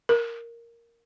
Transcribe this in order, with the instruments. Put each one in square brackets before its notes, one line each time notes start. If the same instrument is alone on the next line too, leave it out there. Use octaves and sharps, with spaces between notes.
[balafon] A#4